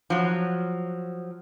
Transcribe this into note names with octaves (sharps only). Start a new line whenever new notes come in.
F3 F#3